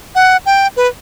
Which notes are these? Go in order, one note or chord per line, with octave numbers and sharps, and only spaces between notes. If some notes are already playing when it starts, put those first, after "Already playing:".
F#5
G5
B4